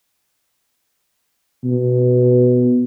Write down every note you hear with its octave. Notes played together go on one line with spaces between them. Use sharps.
B2